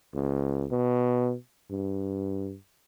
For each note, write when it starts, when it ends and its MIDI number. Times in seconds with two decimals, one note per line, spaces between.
0.15 0.66 37
0.71 1.35 47
1.71 2.56 43